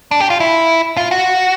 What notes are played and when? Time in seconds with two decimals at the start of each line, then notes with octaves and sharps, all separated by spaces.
0.11 D4
0.20 G4
0.30 F4
0.40 E4
0.97 F4
1.11 F#4